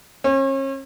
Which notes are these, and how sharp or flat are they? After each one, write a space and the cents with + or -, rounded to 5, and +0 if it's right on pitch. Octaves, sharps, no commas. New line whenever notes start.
C#4 -40